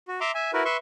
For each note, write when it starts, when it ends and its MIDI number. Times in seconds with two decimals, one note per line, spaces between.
0.08 0.20 66
0.21 0.31 76
0.21 0.31 82
0.21 0.31 84
0.21 0.31 86
0.34 0.51 76
0.34 0.51 80
0.53 0.63 64
0.53 0.63 66
0.53 0.63 70
0.53 0.63 71
0.65 0.77 71
0.65 0.77 76
0.65 0.77 84
0.65 0.77 85